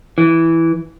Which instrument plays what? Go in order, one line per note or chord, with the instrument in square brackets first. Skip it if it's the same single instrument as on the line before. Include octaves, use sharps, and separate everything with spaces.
[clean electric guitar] E3